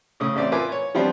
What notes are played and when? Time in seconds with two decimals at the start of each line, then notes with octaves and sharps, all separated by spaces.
0.20 A2 C#3 D#6
0.36 A1 C4 C#4 D5 E5
0.52 F4 A#4 B4 E5 G#5 D6
0.72 C#5
0.95 F3 G3 B3 C4 D4 F4